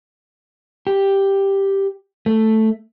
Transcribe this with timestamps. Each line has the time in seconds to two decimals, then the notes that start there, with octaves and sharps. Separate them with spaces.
0.87 G4
2.26 A3